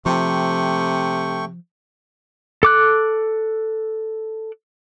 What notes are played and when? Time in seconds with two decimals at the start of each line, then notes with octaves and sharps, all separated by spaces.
0.06 C3 F3 A3 G5 C#6
2.63 A4 D6 F#6